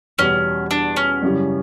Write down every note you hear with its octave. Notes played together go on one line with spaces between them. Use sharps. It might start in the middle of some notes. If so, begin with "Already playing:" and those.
E2 B2 G3 C#4
D4
C#4
F#2 C#3 E3 G3